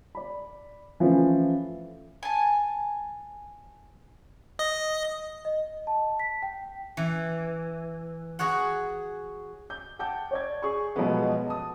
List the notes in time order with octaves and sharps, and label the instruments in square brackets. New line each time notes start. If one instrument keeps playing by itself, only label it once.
[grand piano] D5 B5
E3 F3 A3 C#4
[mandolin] G#5 A5
[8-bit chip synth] D#5
[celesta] D#5
A5
B6
G5
[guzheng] E3
F#4 G#4 C#5 F#5
[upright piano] G6
F#5 G5 A5 G6
C#5 D5 G#6
G#4 C#6
B2 F3 F#3 G#3 A3 B3
A5 D#6